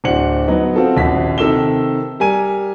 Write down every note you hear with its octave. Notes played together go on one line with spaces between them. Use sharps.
D1 D4 F#4 C5 C#7 F#7
F#3 B3 D#4
C4 F4 F#4 A4
D#1 A#1 D#2 F#4 B6
C3 D#3 A4 E6 E7 G7
G3 A#4 G#5 D#7